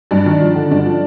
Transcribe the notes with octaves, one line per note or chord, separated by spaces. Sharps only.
G2 D4
D#3
F3
D3
G2 D4
F3